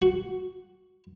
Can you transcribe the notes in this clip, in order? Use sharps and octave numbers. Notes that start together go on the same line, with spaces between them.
F#4